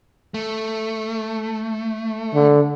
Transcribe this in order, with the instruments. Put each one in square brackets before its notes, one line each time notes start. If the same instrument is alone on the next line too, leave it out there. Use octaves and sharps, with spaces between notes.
[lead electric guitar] A3
[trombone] D3